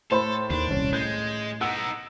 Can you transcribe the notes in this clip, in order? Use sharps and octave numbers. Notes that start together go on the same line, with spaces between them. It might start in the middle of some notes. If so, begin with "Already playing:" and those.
A2 A4 C5 B5
D#2 D#3 D4
D#1 C2 C#4
A2 G#3 G6
B3 D#4 F#5 E6 D7